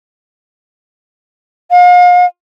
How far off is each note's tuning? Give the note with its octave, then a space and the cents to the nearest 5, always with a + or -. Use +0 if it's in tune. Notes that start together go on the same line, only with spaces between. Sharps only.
F5 +40